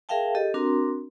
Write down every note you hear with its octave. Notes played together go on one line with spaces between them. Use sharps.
G#4 A#4 E5 F5 G5 A5
G4 A4 D#5
C4 D4 F#4 A#4 A#5 C6